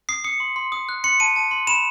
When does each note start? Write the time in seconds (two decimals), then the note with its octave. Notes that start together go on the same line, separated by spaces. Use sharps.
0.09 D#6 C7
0.24 D#6 C#7
0.40 C6
0.56 C6
0.72 D#6
0.89 F#6
1.04 C6 C#7
1.20 A5 D#7
1.36 A5
1.51 C6
1.67 B5 E7